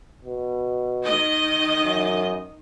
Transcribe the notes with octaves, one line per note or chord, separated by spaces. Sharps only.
B2
D#3 D#5
F#2